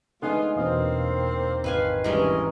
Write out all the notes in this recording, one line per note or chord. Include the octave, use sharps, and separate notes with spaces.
G#2 A3 B3 D4 D#4 F4 F#5 G#5
E2 B2 A#3 C4 F5 D#6
G#1 B4 F5 G#5
G2 E3 G#3 C#4 A#4 D#5